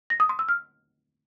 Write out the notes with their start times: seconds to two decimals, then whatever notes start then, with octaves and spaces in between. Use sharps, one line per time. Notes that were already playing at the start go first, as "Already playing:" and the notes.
0.10 A#6
0.20 D#6
0.29 C6
0.39 E6
0.49 F6